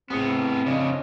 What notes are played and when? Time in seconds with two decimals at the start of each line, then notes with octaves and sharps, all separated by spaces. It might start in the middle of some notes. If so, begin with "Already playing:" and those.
0.10 A2 B3 C4 G#4 D#6 C#7
0.66 F2 C#3 C#4 D4 D#5